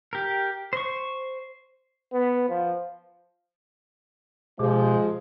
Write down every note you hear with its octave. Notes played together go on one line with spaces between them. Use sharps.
G4 A#4
C5 C#6
B3
F3
B2 F3 G#3 G4